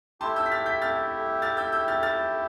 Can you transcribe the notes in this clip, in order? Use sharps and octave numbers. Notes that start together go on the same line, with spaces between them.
A3 E4 G4 A5 C6
E6 G6
B6
F6 A6
G6 B6
F6 A6
F6 A6
E6 G6
E6 G6
F6 A6
F6 A6